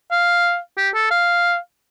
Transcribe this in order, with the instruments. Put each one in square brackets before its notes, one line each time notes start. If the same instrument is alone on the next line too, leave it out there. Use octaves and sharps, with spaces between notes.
[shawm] F5
G4
A4
F5